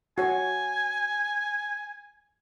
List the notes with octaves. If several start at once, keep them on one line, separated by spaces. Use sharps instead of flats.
F#4 C#5 G#5